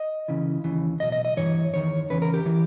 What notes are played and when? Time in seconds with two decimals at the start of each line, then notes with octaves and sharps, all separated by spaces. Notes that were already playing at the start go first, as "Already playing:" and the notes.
Already playing: D#5
0.28 C#2 C#3 E3
0.64 D#2 C#3 E3
1.00 B1 B2 D#5
1.12 D#5
1.25 D#5
1.37 G2 E3 C#5
1.74 E2 D#3 C#5
2.10 E2 C#3 E3 B4
2.22 A#4
2.34 G4
2.46 E3